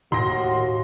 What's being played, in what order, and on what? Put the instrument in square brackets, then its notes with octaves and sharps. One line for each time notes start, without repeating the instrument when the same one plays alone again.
[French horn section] D#2 F#4 [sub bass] A2 [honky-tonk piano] C6 A#6